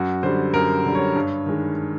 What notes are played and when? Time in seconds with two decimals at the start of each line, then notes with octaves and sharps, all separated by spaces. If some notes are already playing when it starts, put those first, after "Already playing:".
Already playing: F#2 F#4
0.23 D3 G3 C5
0.54 F#2 A#4
0.84 D3 G3
0.95 C#5
1.16 G2
1.46 D#3 G#3